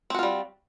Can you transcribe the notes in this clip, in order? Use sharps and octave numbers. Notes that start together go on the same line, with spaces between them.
G3 C4 F4 F#4